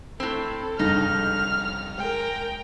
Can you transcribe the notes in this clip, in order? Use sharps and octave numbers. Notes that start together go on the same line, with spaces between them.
A2 C4 A4
F1 C#2 G2 D#4 F6
G#3 A#4 G5